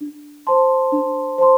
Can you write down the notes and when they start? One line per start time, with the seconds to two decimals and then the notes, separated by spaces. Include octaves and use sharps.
0.01 D4
0.47 C5 A5 C6
0.92 D4
1.38 C5 A5 C6